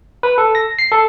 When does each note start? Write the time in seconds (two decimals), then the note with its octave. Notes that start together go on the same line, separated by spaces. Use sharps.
0.23 B4
0.38 A4
0.55 A#6
0.79 C7
0.92 A4